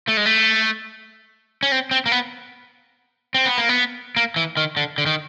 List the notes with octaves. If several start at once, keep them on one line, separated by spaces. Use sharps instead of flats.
A3
G#3
A3
C#4
C4
C4
A#3
B3
C4
B3
A#3
B3
A#3
E3
D#3
D3
D3
D#3